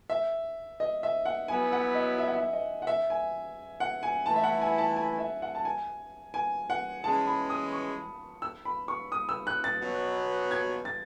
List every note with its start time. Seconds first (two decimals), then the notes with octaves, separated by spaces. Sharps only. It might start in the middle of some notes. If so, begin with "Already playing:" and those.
0.10 E5
0.80 D#5
1.03 E5
1.25 F#5
1.48 F#3 B3 E4 G#5
1.72 F#5
1.95 D#5
2.18 E5
2.27 F#5
2.36 E5
2.53 D#5
2.82 F#5
2.87 E5
3.10 G#5
3.80 F#5
4.03 G#5
4.26 E3 A3 E4 A5
4.36 E5
4.44 F#5
4.61 G#5
4.78 A5
4.96 G#5
5.19 E5
5.42 F#5
5.55 A5
5.65 G#5
6.34 G#5
6.70 F#5
7.04 E3 G#3 C#4 G#4 A5
7.27 B5
7.50 D#6
7.73 C#6
8.42 E6
8.65 B5
8.88 C#6
9.12 D#6
9.29 E6
9.47 F#6
9.64 A6
9.81 B2 F#3 B3
10.51 G#6
10.85 A6